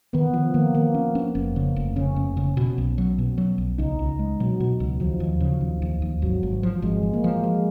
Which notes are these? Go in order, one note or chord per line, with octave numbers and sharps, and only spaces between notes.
D#3 B3
D#3 F3
D#3 A#3
D#3 A#3
C#4
C#4
F1
C#3
F1
C#3 C#4
F1
C#3
B2
B1
F#3
B2
F#3
B1
C#2 D#4
C#2
G#3
B2 F#3
B2
C#2
D#2 F3
D#2
C#3
D#2
D#2
D#2
G#1 F#3
G#1
F3
G#1 G#3
F3
A#3
F3
F3 G#3